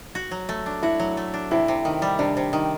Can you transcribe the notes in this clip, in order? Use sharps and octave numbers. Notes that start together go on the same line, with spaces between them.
F#4
F#3
A3
D4
E4 F#4
F#3
A3
D4
C3 E4
C3
D#3
G3
C3 D4
C3
D#3